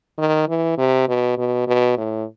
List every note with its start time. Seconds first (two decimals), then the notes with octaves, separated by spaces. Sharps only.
0.18 D#3
0.48 E3
0.78 C3
1.08 B2
1.38 B2
1.68 B2
1.97 A2